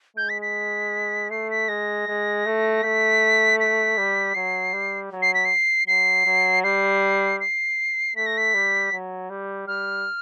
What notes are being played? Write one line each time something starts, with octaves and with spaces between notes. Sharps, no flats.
G#3 G6
B6
B6
A3 C7
B6
G#3 A#6
G#3
A3
A3 B6
B6
G3
F#3 C7
G3
F#3
C7
B6
C7
F#3 C7
F#3
G3 C7
C7
A3 B6
A#6
B6
G3
F#3
G3
G3 F6